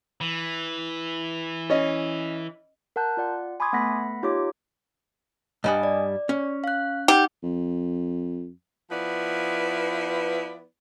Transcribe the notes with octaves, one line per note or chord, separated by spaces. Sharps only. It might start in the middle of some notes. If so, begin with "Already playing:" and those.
E3
C#4 D#5
A#4 F#5 A5 F#6 G6
F4 D5 F#5
G#5 B5 C6 D6 D#6 G#6
A3 B3 F#5 B5 A#6 B6
D#4 F4 G4 C#5 D6
G2 G3 D#5 F#5 G#5 D#6
D5
C#4
F5 F#6
D#4 G4 F#5 G5
F2
F3 B3 E4 B4 D5